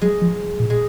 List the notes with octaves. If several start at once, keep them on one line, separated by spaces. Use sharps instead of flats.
F#3 G#3
F3
A#2
G#3